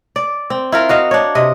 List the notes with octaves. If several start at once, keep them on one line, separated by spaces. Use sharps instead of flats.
D5
C4
E4 F4 A#4
F#4 D#5 F5
D4 C#5
C3 D#5